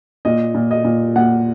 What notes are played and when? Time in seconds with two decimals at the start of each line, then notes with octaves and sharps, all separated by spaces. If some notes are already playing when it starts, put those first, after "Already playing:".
0.25 A#2 D#5
0.55 A#2
0.71 D#5
0.85 A#2
1.16 A#2 F#5